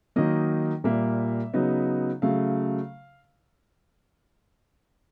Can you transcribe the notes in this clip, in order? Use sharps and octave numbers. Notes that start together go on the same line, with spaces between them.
D#3 F#3 A#3 D#4 D#5
A#2 G3 A#3 E5
C#3 F#3 B3 D#4
C#3 F#3 A3 F5